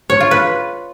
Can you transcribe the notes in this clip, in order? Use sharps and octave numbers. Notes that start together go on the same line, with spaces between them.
C#5
F4
B4